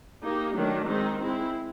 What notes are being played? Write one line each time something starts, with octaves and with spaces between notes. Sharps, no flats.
A#3 D#4 G4
D#3 F#3 A3 D4
D#3 G#3 C4 D#4
G#3 C4 E4